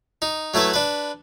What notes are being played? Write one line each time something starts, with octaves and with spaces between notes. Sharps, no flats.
D#4
F#3 A3 E4 B4 E5
D4 B4